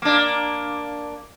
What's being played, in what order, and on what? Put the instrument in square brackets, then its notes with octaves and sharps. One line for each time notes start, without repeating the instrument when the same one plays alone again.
[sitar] A#3 D4